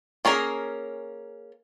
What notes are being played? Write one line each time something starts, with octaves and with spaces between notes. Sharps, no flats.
A#3 C#4 G#4 A#4